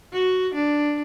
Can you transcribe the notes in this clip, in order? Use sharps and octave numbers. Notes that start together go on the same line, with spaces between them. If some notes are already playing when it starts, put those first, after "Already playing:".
F#4
D4